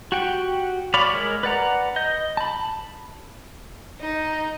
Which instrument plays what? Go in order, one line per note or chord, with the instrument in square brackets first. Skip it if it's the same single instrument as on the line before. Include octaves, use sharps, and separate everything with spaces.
[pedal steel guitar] F#4 G4 F#5 G5
C#5 D5 F5 B5
G#3 A#4
B4 D5 F#5 A#5
D#5 G6
A5 B5
[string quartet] D#4